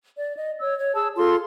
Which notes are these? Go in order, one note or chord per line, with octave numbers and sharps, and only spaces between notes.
D5
D#5
C#5 E6
C#5
G#4 A5 E6
F4 G#4 A4 C6